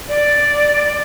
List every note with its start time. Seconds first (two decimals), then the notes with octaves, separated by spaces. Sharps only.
0.09 D5